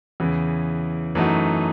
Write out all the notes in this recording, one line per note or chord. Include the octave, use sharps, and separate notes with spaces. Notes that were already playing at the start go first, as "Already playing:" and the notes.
E2 C#3 E3
F#2 E3 A3 D#4 F#4